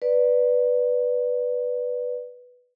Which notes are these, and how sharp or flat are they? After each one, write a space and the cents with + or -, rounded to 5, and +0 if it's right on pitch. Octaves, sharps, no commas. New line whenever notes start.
B4 +0 D5 +0